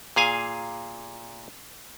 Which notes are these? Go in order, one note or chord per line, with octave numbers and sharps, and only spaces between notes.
A#2 G#4 F5 G#5